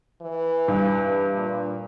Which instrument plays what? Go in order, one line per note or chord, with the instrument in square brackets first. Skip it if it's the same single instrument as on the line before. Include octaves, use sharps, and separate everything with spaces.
[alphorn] E3
[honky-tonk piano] G2
[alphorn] A#2